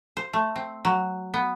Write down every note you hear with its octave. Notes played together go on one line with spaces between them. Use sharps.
C5
A3
C4
F#3
B3